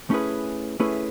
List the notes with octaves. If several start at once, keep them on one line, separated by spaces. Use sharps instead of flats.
A3 C#4 E4 G#4 B4
A3 C#4 E4 G#4 B4